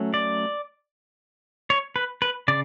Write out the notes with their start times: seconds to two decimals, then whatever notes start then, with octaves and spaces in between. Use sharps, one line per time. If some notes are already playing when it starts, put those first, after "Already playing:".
Already playing: F#3 A3 C#4
0.14 D5
1.70 C#5
1.96 B4
2.22 B4
2.48 C#3 D5